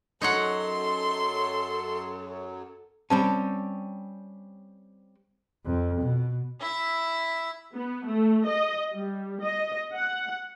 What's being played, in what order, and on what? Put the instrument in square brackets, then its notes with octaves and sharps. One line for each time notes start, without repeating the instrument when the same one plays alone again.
[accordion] F#2 F#3 [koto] D#4 C#5 F#5 [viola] A4 [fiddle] C6
[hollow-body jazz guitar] G3 C4 C#4 [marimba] A5
[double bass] F2
B2
[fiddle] E4 E5
[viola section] B3
A3
D#5
G3
D#5
F#5